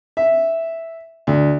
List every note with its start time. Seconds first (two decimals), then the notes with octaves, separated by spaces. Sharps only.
0.17 E5
1.27 D2